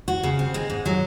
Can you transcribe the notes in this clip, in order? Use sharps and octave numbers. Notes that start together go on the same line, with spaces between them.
F#4
C#3
C4
G#3
G#2
F#3